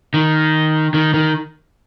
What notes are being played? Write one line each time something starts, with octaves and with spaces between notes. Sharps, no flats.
D#3
D#3
D#3